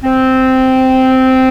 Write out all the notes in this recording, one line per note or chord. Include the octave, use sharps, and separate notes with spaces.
C4